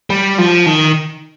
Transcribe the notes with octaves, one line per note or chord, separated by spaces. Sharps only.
G3
F3
D#3